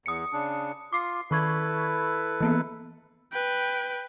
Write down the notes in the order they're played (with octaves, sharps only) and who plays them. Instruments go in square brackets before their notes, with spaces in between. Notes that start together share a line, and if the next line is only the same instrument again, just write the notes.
[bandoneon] E2 [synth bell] D#6 C#7
[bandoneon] C#3 D4
[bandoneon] F4 [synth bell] D6 C7
[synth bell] D#3 C#6 G#6 [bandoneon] E4 A4 B4
[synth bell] E3 A#3 B3
[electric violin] B4 G5